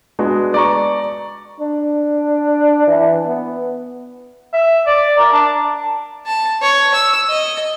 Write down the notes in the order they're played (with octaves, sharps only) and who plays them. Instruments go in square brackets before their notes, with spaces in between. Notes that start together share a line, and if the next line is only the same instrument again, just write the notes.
[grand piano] G#3 B3 D4 F#4
D5 A#5 C#6
[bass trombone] D4
E3
B3
[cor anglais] E5
D5
A#4
D4
[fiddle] A5
C#5
E6
D#5